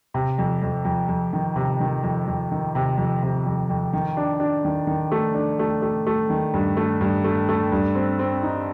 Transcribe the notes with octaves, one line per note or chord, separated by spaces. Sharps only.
C3
F2
F2
F2
F2
D#3
C3
D#3
F2
F2
D#3
C3
F2
C3
F2
F2
D#3
D4
D4
D#3
D#3
A3
D4
A3
A3
A3
D#3
G2
A3
G2
A3
A3
G2
C4
C4
D#4